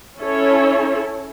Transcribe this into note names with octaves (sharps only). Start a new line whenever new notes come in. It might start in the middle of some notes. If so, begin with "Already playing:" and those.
C#4 E4 A4 C#5